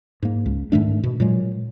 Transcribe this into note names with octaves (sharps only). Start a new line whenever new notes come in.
G#2 A#3
C#2
G#2 D#3 A3 D4
B2
A#2 F#3 G#3